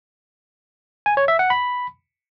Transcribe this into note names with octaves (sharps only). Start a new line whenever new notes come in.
G#5
C#5
E5
F#5
B5